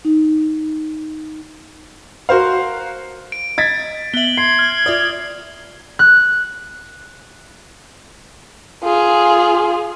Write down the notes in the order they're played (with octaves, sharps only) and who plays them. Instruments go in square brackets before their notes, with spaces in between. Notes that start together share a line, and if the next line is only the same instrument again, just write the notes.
[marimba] D#4
[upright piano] F#4 A#4 C5 F5
[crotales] D7
[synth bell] D#5 [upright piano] G#6 A6 B6
[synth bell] B3 E5 [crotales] F#7 G7
[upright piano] C6 [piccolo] G#6 [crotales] C7
[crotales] F6
[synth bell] F4 E5 D#6 [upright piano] D5
[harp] F#6
[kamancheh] F4 G#4